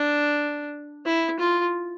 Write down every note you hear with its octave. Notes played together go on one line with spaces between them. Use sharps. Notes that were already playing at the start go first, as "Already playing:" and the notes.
Already playing: D4
E4
F4